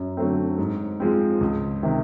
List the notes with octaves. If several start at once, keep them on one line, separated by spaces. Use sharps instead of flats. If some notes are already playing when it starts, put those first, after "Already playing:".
Already playing: F#2
D3 F#3 A3 C4
G#2
F3 G#3 C4
C#2
C3 D#3